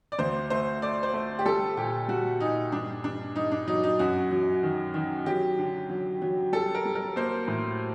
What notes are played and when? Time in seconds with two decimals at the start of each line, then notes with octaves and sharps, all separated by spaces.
0.12 D5
0.19 D2 C5
0.50 A3 C5
0.82 A3 D5
1.03 C5
1.13 A3
1.39 G4
1.45 G3 A4
1.77 A#2 G4
2.08 G3 F#4
2.41 A#2 D#4
2.72 G2 D4
3.04 G2 D4
3.36 G2 D#4
3.52 D4
3.68 F#3 D#4
3.84 D#4
3.99 F#2 F#4
4.31 F#3
4.63 D#3
4.94 D#3
5.26 F#3 G4
5.59 D3
5.90 F#3
6.22 F#3
6.53 G3 A4
6.75 A#4
6.85 G3
6.95 A#4
7.16 A#3 C5
7.48 A2